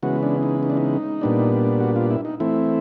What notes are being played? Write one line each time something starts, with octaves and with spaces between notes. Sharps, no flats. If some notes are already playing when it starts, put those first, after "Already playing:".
C#3 E3 G#3 B3 F#4
D4
D#4
D#4
D4
D#4
A#2 G3 B3 D4
F#4
F4
E4
D#4
E3 A3 C4 E4